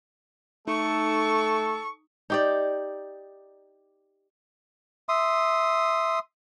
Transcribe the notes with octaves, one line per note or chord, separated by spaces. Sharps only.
A3 D#4 A4 C#6
D#4 G4 D5
E5 C6 D#6